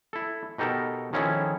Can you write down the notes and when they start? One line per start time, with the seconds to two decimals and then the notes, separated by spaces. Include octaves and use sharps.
0.13 E4 A4
0.58 B2 D#4 G4 A4 A#4
1.13 D#3 F3 C#4 E4 G#4 A4